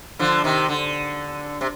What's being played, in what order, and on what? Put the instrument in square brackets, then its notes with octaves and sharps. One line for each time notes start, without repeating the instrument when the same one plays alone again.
[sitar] D3 F3
C3 D#3
D3
C3